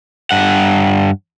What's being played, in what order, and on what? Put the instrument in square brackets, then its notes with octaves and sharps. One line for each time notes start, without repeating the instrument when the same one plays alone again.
[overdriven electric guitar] G2 F#5